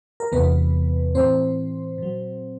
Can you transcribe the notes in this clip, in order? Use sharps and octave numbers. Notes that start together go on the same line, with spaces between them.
A#4
E2 C3 E3 B3 B4
A2 E3 C4 C5
A#2 F#3